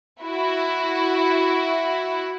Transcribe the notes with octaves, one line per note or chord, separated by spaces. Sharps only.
E4 F#4